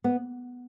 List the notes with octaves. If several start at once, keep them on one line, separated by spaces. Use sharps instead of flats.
B3